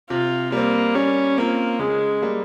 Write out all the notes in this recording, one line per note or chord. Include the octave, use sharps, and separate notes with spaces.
C3 F4
G3 A#3 C4
G3 C#4
A#3 C4 F4
C#3 G#3
G3 A#3